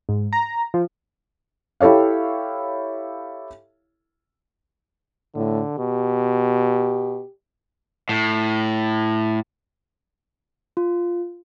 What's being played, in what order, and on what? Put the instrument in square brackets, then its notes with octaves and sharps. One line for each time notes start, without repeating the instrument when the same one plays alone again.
[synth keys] G#2
A#5
F3
[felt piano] E4 G4 A4 C#5 F5
[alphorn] A2 [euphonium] D3
[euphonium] B2 [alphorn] G4
[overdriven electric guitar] A2
[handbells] F4